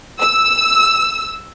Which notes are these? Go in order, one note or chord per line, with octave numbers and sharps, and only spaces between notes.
E6